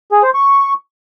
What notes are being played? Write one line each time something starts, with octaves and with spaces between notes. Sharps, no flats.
G#4
C5
C#6